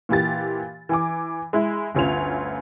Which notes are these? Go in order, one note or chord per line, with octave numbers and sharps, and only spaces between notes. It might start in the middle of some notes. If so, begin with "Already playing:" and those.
A#2 E3 G4 A6
E3 G#5 D6
G#3 E4
G1 D2 C#4 F4 F7